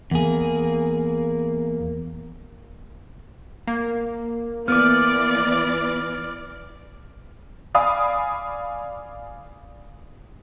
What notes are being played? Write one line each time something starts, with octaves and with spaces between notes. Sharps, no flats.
E2 A#3 G#4
A#3
E3 B3 D5 D6 F6
D5 F5 G#5 B5 D#6